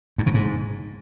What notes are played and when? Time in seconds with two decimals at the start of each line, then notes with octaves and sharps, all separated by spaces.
0.18 G2
0.26 B2
0.34 G#2